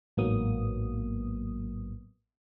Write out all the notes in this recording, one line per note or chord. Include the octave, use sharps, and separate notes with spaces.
A1 G#2 F#3 A#3 B3 D#6